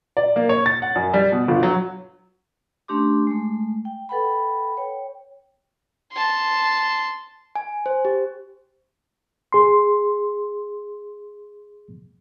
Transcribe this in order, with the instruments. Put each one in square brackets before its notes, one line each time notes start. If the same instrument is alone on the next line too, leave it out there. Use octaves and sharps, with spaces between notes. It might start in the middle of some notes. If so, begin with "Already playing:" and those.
[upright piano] D5
A#3
C#5
A6
F#5
F#2
G3
B2
G1
F#3
[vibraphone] A3 C#4 D4 G4 C6 D6
G#3 A3
G5
A4 B4 F#5 G5 B5
C#5 G5
[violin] A5 C6
[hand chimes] G#5
C5
G4
[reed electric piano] G#4 C6